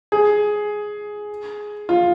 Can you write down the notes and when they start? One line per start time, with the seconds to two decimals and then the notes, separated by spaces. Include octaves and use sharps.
0.12 G#4
1.89 F4